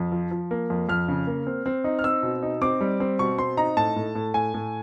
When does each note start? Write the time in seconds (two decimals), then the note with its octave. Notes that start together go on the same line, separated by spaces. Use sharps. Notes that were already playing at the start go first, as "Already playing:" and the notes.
Already playing: F2
0.12 F3
0.31 F3
0.51 A#3
0.70 F2
0.89 F2 F6
1.08 C#3
1.27 A#3
1.47 C4
1.66 C4
1.84 D#4
1.99 F6
2.04 C4 E6
2.23 B2
2.43 D#4
2.62 C4 D6
2.81 G3
3.00 C4
3.19 B2 C#6
3.38 C4 C6
3.57 D#4 A#5
3.77 A2 A5
3.96 A2
4.15 A2
4.34 A2 G#5
4.54 A2